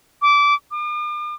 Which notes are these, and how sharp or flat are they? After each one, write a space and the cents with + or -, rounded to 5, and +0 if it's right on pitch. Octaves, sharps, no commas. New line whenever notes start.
D6 -20
D6 +45